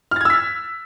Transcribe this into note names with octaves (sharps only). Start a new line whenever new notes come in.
E6 F6 G#6 A6 B6